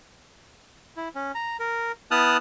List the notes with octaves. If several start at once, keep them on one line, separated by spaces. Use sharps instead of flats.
E4
C#4
A#5
A#4
B3 E4 A5 D#6 F6 F#6